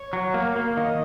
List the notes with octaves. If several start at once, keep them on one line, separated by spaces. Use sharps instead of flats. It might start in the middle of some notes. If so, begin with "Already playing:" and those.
Already playing: C#5
F#3
A#3 F5
A#3
D#3 D#5